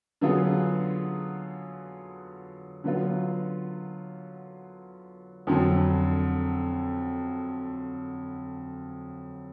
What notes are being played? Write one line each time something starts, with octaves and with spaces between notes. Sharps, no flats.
D3 F#3 B3 F4 G#4
D3 F#3 B3 F4
F2 D3 F#3